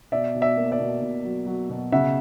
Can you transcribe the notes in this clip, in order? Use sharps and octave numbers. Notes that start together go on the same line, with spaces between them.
B2 D5 E5
B2
D5 E5
A#3
D5 E5
B2
B2
F#3
F#3
B2
C#3 E5 F#5